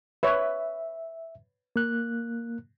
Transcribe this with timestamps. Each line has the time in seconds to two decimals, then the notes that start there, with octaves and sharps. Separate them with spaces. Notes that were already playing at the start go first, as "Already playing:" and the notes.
0.23 B4 C#5 E5
1.76 A#3 F#6